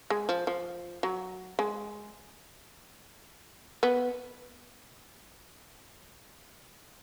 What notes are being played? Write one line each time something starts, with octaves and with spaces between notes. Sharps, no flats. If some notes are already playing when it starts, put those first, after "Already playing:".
G#3
F3
F3
F#3
G#3
B3